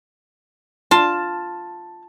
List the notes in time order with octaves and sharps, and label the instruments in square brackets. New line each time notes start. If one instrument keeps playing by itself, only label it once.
[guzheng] F4 [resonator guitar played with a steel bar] A5